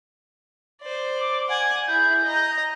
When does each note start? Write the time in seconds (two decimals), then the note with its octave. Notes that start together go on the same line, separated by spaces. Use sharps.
0.82 C5 D5
1.20 D6
1.49 F#5 G#5
1.88 E4 G#4 G6
2.24 D#5 A#5